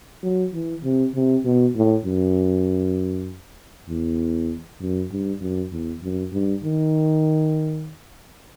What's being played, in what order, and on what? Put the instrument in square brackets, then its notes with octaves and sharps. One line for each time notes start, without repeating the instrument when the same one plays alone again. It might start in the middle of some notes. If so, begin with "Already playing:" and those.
[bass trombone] F#3
E3
C3
C3
B2
A2
F#2
E2
F#2
G2
F#2
E2
F#2
G2
D#3